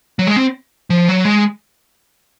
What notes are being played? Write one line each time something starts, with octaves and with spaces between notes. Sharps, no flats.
F#3
G#3
C4
F3
F#3
G#3